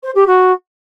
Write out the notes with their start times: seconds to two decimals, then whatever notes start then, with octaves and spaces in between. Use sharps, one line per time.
0.03 C5
0.15 G4
0.27 F#4